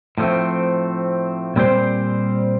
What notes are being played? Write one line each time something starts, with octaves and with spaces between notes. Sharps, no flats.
A2 F3 A3 C4
A#2 G3 C4 G4 C5